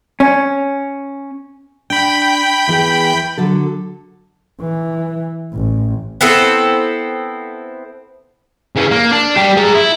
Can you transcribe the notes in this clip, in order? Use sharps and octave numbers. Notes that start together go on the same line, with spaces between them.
C#4
D4 G5 B5
E2 E3 G#4
D3 F#3 A4
E3
A1
B3 C4 E4 A4
C#3 E3
A#3
D4
G3 G4
G#4 A#5
E4